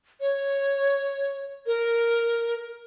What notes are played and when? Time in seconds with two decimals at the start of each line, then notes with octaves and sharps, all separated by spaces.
0.21 C#5
1.67 A#4